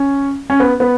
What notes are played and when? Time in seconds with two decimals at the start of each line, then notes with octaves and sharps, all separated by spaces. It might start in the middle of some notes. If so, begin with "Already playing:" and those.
Already playing: C#4
0.50 C#4
0.60 B3
0.80 B3